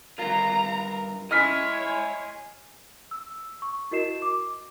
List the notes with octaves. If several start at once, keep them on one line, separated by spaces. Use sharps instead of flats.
G2 F4 A#4 A#5
E4 C#5 D#5 G#5 F6 B6
E6
C#6
E4 F#4 A#4 D#5 C7 E7
D6